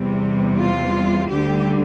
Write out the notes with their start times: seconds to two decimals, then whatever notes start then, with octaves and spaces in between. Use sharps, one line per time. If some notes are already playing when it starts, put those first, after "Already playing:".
Already playing: E2 C3 G3
0.59 F4
1.30 D2 D3 G3 G4